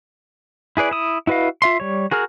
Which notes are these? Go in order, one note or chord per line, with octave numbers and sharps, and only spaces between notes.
E4 G#4 B4 D5
E4 D#6
E4 F#4 B4 D#5 F5
F4 E5 C6
G3 C#5
F#4 G#4 A#4 F6